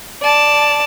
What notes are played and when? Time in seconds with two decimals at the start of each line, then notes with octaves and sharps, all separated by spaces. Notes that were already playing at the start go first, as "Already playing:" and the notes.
0.23 D5 A5